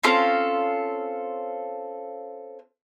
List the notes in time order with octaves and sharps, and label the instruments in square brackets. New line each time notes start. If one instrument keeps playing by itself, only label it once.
[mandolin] C4 C#4 F4 A4